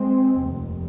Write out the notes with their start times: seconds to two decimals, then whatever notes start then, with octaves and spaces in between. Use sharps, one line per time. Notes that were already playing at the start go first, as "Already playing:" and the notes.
Already playing: G#3 C4
0.44 F1 D#2